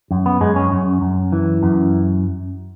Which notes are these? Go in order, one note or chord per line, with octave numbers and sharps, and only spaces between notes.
F#2
B3
F#2 G#3
C#4
F#2
F#2
E3
F#2